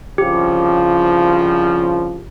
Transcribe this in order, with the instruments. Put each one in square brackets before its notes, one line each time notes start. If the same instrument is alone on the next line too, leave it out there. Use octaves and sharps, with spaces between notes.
[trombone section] C2 C#3 F3 [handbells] G4